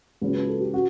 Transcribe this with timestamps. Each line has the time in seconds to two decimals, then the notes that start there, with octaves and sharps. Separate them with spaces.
0.21 C#2 C#3 F#3 C#4 B4
0.35 B4
0.48 A4
0.60 G4
0.74 C#4 F#4